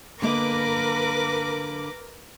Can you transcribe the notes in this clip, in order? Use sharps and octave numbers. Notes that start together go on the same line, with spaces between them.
D3 A#3 A#4 B4 D#5 D6